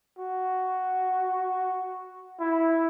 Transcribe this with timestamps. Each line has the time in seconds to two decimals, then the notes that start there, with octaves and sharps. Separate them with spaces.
0.18 F#4
2.40 E4